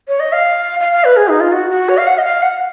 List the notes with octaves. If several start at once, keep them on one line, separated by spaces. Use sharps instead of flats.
C#5
D#5
F5
F5
F5
B4
G#4
D#4
F4
F#4
F#4
C#5
F5
F#5
D#5
F5
F#5